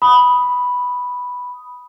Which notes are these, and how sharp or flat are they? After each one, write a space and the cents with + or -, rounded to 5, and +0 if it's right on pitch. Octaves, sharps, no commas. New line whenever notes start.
B5 +0 D#6 +0